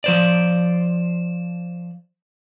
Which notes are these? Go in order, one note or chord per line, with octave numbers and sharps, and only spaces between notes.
F3 C5 D5